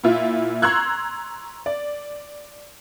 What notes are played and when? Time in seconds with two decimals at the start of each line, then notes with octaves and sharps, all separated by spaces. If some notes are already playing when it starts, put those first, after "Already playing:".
0.04 A#2 E4 F4
0.62 A#5 C6 C#6 E6 F#6 G#6
1.66 D5